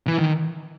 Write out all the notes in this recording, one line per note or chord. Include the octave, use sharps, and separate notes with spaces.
E3
D#3